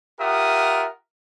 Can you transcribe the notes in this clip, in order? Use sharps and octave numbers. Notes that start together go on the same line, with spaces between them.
F4 G4 A#4 E5 F#5 D#6